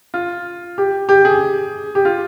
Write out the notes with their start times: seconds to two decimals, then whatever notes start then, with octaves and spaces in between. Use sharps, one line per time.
0.14 F4
0.78 G4
1.09 G4
1.25 G#4
1.95 G4
2.05 F4